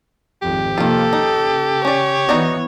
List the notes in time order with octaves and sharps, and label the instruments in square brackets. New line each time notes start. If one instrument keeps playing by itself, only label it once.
[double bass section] G#1 F2 [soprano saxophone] G4
[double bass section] C3 F3 A#3 [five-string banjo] D#3 F4 [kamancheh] A4
[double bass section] C#3 [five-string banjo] D#4
[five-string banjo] C#4 D5 [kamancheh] C#5
[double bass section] E3 B3 [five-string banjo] D#4 F#4 D5